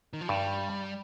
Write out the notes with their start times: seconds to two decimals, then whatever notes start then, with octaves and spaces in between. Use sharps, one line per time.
0.13 D#3
0.21 F3
0.28 G2 G3